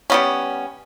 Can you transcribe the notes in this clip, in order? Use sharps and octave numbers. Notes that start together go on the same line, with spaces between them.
G3 B3 C#4